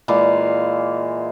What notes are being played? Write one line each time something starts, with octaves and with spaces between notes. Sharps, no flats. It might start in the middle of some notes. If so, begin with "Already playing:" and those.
A#2 E3 G#3 F5